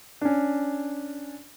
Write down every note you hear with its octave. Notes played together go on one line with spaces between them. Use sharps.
C#4 D4